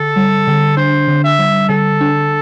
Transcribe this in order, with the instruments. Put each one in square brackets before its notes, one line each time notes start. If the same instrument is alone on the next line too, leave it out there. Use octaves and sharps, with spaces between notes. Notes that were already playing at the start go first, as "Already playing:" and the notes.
Already playing: [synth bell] D3 [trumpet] A4
[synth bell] G3
D3
[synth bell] D4 [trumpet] C5
[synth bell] D3
[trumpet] E5
[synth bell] G3
[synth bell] D3 [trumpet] A4
[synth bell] D4